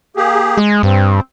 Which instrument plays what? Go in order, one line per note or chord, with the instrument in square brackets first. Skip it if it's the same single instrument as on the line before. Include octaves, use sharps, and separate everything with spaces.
[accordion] A#3 G4 G#4
[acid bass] G#3
[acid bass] G2 [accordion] C4